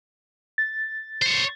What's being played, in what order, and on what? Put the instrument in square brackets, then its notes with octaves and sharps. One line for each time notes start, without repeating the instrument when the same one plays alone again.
[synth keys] A6
[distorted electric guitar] C5 C#5